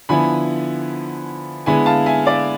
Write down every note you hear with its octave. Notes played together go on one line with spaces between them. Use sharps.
D3 F3 B3 E4 G#5 B5
D3 G#3 B3 E4 G#5 B5
F5 A5
E5 G#5
D5 F5